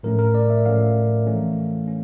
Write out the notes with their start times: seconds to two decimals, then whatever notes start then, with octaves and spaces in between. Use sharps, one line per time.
0.03 A2 F3 A3 C#4 A#4
0.19 A#4
0.35 D5
0.50 E5
0.66 A2 F3 A3 C#4 F5
1.27 E3 A3 C#4
1.88 C#4